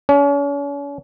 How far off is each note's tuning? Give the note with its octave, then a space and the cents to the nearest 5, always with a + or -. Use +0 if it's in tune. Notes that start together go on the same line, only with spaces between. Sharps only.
C#4 +40